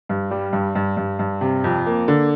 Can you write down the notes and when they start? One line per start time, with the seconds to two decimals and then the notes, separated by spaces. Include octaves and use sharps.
0.09 G2
0.31 G3
0.53 G2
0.75 G2
0.97 G2
1.19 G2
1.41 C3
1.64 F2
1.86 A#3
2.08 D3